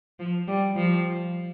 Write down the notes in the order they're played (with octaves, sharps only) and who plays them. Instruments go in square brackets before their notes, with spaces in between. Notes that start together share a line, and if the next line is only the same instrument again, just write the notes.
[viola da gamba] F3
G3
F3